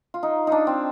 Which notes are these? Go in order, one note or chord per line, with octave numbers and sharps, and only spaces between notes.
F4
D#4
D4 D#4
C4